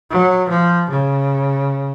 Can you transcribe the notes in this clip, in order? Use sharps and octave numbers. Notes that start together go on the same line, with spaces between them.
F#3
F3
C#3